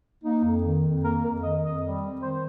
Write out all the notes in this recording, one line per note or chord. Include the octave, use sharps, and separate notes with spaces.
A#3 D#4
F2
D#3
F2
A#3 A#4
F2 A#4
D#3 D#5
F2 D#5
G3
C4
D#3 C5